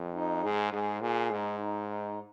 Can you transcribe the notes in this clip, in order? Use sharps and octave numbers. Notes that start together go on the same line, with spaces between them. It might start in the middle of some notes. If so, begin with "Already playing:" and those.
Already playing: F2
D#4
G#2 G#4
G#2 G#4
A#2 G#4
G#2 D#4
D#4
D#4